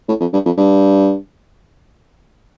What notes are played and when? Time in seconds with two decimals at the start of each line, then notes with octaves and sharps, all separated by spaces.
0.09 A2
0.21 F2
0.33 G2
0.46 F2
0.58 G2